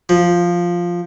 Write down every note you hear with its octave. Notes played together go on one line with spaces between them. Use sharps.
F3